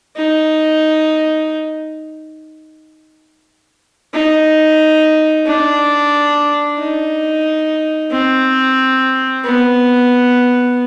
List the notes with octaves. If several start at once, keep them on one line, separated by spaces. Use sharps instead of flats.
D#4
D#4
D4
D#4
C4
B3